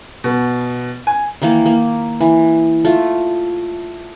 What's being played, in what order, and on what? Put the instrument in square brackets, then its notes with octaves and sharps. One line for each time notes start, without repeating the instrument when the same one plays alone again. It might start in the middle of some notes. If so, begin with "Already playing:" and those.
[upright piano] B2
G#5
[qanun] D#3 E3 A#3
A#3
E3
A3 F4